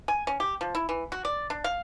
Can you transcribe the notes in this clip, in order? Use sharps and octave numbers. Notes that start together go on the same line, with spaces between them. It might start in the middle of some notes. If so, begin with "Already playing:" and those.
G#5
C#4
G4
F3
E4
E3
F#4
D5
D4
F5